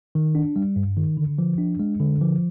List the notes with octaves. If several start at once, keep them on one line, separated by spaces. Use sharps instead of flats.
D#3
D4
G3
G2
D#3
D3
F3
D4
G#3
D3
F3